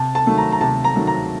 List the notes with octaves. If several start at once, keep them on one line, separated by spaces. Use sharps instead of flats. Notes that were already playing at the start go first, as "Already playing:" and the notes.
Already playing: C3 A5
A5
D#3 F#3 A3
A#5
A#5
C3 A5
A#5
D#3 F#3 A3
A#5